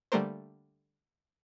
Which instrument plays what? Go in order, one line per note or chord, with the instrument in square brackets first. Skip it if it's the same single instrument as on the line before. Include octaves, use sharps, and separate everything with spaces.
[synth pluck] D3 G3 A3 A#3 A#4 C5